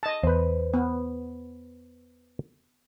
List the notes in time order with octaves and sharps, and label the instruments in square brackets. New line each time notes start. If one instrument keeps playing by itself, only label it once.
[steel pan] D#5 A5
[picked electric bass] E2 [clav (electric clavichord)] B4 C5
[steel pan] B3